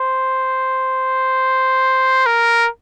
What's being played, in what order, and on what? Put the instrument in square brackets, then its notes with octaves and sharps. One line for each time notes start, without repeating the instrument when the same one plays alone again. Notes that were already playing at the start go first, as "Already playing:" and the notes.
Already playing: [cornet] C5
A#4